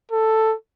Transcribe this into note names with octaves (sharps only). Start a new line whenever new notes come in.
A4